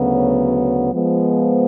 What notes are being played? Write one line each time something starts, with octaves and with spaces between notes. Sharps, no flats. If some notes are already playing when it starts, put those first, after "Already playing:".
Already playing: D2 C#3 F#3 B3
F3 G#3 B3